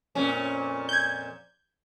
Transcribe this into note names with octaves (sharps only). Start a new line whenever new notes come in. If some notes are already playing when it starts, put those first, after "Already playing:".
F2 A#2 C#4
G6 G#6